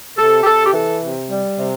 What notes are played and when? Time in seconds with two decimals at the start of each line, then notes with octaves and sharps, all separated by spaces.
0.17 C3 A4
0.42 G4
0.45 C3 A4
0.66 G4
0.73 E3 A4
1.02 C3
1.30 G3
1.59 C3